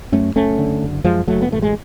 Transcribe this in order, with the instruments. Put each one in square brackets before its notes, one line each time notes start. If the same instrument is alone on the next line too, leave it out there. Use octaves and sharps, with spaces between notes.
[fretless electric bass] F#2 A3 C#4
F#1 A3 C#4
D3
F#1
F#2 F3 G#3
F#1 F#3 A3
B3
A1 A3
G#3